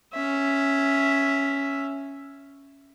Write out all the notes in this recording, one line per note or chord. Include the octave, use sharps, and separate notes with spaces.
C#4 E5